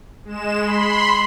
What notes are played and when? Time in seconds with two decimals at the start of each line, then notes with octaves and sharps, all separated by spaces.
0.25 G#3 E7
0.59 B5 C6